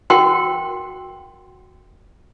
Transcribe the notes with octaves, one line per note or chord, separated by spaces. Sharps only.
F#4 A#4 F#5 G5 C6